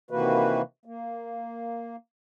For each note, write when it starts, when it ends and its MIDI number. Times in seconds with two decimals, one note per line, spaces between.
0.11 0.62 48
0.11 0.62 51
0.11 0.62 52
0.11 0.62 58
0.11 0.62 66
0.11 0.62 71
0.85 1.96 58